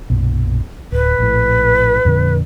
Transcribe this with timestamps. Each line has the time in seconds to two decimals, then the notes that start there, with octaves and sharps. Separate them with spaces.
0.10 B1 F#2 A#2
0.92 D1 B4
1.19 A#1 A2
2.05 F2 A#2 D3